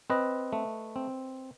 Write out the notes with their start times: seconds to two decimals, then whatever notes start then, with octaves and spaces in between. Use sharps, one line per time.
0.10 C4 B4 D#5
0.53 A3
0.96 C4